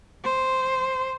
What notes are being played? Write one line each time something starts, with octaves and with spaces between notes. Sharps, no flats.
C5